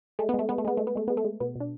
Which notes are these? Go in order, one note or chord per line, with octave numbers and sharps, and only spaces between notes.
G#3 A3
B3
G#3 A3
G#3 B3
A3
G#3 B3
G#3 A3
B3
G#3 A3
G#3 B3
A3
G#3
B2 B3
B2 D4